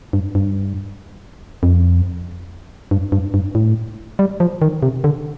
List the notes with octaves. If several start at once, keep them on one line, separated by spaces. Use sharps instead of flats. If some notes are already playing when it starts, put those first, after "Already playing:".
G2
G2
F2
G2
G2
G2
A2
G3
F3
D#3
C3
D3